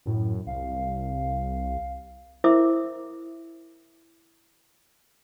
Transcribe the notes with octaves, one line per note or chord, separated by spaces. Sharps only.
F#2 A2
C2 F5
E4 A#4 C5 E5 D6